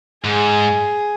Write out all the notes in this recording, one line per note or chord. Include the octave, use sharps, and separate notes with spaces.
G#2 G#4